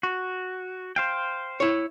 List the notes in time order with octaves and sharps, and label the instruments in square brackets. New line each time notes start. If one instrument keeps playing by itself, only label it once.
[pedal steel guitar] F#4
C5 F5 G5
[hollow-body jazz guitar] E4 C#5